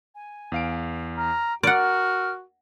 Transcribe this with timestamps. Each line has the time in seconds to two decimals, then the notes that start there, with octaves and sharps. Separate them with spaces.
0.15 G#5
0.52 E2 F5 D7
1.18 A#5 F6
1.63 F#4 A#4 D5 F#5 F6